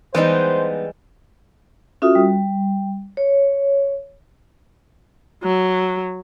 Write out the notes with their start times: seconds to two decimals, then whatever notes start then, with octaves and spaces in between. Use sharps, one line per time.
0.15 E3 G3 G#3 B3 D#4 C5
2.02 C#4 F4 F#4 A4 E5 D#6
2.15 G3
3.17 C#5
5.43 F#3